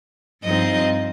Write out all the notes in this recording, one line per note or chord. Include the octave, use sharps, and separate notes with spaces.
G2 F3 C4 D#4 D#5